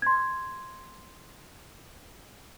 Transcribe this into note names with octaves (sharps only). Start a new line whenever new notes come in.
C6 G#6